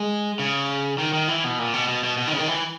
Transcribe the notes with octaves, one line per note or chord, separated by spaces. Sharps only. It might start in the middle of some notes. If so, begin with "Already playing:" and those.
Already playing: G#3
C#3
D#3
D#3
E3
B2
A#2
B2
B2
B2
B2
D#3
C#3
D#3
E3